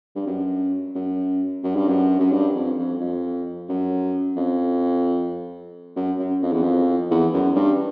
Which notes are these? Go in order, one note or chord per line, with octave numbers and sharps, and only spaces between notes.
G2
F#2
F#2
F#2
G2
F#2
F#2
G2
F2
F2
F2
F#2
F2
F#2
F#2
F2
E2
F2
E2
F#2
G2